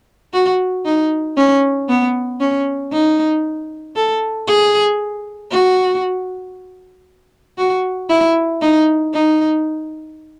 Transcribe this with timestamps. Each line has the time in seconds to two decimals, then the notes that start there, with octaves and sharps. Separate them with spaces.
0.33 F#4
0.85 D#4
1.37 C#4
1.89 B3
2.40 C#4
2.93 D#4
3.96 A4
4.47 G#4
5.51 F#4
7.58 F#4
8.09 E4
8.61 D#4
9.14 D#4